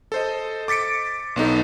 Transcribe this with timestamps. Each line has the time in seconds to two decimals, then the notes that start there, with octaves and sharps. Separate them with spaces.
0.12 A4 C5 D#5
0.68 D6 A6 B6 C#7 D7
1.36 B1 B3 D#4 A4